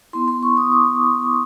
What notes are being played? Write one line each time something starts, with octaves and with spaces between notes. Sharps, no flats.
B3 E4 C6
C6
C#6
D#6
D6